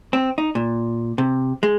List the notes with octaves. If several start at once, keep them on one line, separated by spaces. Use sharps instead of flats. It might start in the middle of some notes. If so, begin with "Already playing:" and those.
C4
D#4
A#2
C3
G#3